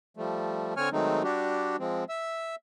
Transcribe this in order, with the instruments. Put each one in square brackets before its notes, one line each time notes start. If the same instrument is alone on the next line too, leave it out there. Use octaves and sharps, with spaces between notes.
[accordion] F3 G3 A3
D3 C4 C#5 G#5 C#6 F6
D#3 F#3 G#3 A3 C4 D#4
G3 D4 F#4 G4
F3 G#3 C4
E5 E6